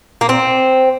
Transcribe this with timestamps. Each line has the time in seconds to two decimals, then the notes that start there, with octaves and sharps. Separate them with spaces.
0.21 A#3
0.29 C4